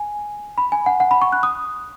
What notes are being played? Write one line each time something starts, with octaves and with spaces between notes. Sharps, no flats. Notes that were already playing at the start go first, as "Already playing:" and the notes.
Already playing: G#5
B5
G#5
F#5
F#5
B5
C#6
F#6
D#6